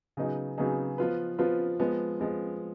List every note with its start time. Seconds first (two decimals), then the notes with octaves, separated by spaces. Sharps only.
0.17 C#3 F#3 B3 D#4 G#4
0.58 C#3 F#3 B3 D#4 G#4
0.98 F3 B3 F4 B4
1.38 F3 B3 F4 B4
1.80 F3 G#3 B3
2.20 F3 G#3 B3